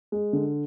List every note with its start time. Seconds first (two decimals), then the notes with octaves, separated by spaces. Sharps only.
0.12 G#3
0.33 D3